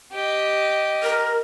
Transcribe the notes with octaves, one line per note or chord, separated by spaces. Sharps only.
G4 D#5
A#4